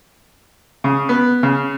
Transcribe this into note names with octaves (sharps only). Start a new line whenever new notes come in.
C#3
B3
C#3